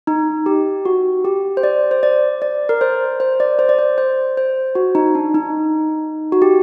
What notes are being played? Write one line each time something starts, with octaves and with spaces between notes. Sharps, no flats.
D#4
G4
F#4
G4
C5
D5
C5
D5
D5
A#4
C5
C5
D5
C5
D5
C5
C5
C5
F#4
D#4
D4
D#4
F#4
G4